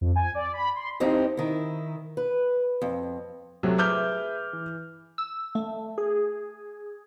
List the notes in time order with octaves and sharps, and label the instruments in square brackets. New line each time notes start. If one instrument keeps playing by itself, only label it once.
[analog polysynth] F2
G#5
D5
B5
C6
[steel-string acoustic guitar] F2 C4 D#4 E4 G4
D#3 E4
B4
F2
[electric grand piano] C3 [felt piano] F#3 A3
[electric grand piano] G#4 B4 E5 [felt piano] D6 F6 G6
[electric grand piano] E3
[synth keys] E6
A3
G#4